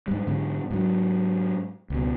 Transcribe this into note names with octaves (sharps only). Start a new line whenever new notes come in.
G#2 G3
G#2 D3
G#2 F#3
C#2 B2